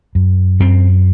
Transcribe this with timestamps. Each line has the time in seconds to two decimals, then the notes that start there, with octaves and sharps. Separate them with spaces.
0.15 F#2
0.60 F#2 C4